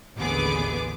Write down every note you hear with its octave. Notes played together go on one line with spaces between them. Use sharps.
A1 D#2 D3 B3 G#4 D6